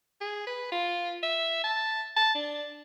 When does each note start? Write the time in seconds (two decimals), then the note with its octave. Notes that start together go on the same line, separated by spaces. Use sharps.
0.21 G#4
0.47 B4
0.72 F4
1.23 E5
1.64 A5
2.16 A5
2.35 D4